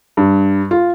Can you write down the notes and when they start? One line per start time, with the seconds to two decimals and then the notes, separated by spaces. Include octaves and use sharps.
0.17 G2
0.71 F4